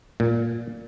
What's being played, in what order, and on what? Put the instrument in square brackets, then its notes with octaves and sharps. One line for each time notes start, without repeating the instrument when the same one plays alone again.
[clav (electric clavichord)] A#2